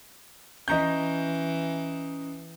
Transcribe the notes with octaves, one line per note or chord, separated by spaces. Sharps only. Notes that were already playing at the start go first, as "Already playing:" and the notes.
E3 C#4 D#5 A#5 G6